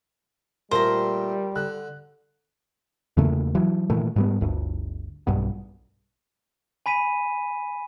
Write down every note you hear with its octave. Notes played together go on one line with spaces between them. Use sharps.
A#2 G3 A3 A#4 C5 A#5
D3 F#6
E2 C#3 A3 A#3
E3 F#3
A#2 D#3 E3 A3
G#2 G3 B3
G1 D2
B1 G2 B3
G#5 B5 B6 D#7